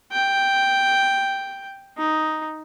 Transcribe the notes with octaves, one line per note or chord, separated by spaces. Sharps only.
G5
D#4